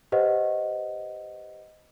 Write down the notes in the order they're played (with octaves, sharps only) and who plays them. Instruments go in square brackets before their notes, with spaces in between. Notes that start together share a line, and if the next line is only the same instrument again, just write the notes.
[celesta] G4 B4 C5 D#5 F#5